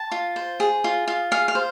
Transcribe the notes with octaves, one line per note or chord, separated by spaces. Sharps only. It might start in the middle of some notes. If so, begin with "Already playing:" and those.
Already playing: A5
F4
C5
G#4
F4
F4
G#4 F5
F5
C5